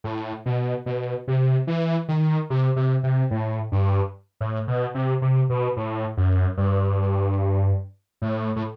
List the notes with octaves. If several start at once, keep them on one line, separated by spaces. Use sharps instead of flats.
A2
B2
B2
C3
E3
D#3
C3
C3
C3
A2
G2
A2
B2
C3
C3
B2
A2
F#2
G2
A2
A2